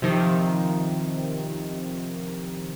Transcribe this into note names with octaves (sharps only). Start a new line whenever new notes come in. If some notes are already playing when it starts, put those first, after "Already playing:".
C3 D#3 F3